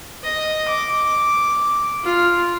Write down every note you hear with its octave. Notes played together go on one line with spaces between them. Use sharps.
D#5
D6
F4